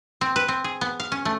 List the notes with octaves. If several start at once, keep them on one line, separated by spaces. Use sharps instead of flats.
C4
B4
C4
G#4
B3
F5
C#4
A3